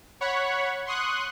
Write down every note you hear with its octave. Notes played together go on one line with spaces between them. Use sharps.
C#5 F#5 B5 C#6
C6 C#6 D#6 F#6